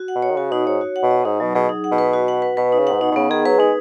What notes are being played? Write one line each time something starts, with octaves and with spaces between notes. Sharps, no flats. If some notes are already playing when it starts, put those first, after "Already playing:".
Already playing: F#4
F#5
B2
C#5
D#3
C#3 F#4
B2 D#4
G#2 C#5
F#4
F#5
B2
D#5
G#2 D#4
B2 F#3
B2 G#4
D#4
F#5
B2
B4
F#4
F#5
B4
B2 B4
D#4
C#3
F#5
G#2
B2 D#4
B2
C#3 B3
D#3 G#4
F#3 B4
G#3 D#4